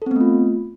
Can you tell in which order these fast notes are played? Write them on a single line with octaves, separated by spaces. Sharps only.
A4 C4 B3 A3 F4